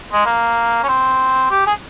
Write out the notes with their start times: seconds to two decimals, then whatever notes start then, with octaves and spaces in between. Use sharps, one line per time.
0.13 G#3
0.26 A#3
0.84 C#4
0.88 C4
1.51 G4
1.67 G#4